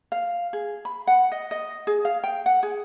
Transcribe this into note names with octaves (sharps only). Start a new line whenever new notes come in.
F5
G#4
B5
F#5
D#5
D#5
G#4
F5
G5
F#5
G#4